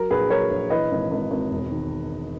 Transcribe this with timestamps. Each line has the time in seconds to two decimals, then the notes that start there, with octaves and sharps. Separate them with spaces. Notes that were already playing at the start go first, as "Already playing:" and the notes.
Already playing: F#3 A#4
0.10 A#1 G#4 B4
0.30 F#3 A#4 C#5
0.51 A#1
0.70 E3 B4 D#5
0.91 G#1
1.11 G#1
1.31 G#1
1.51 E1
1.71 D#3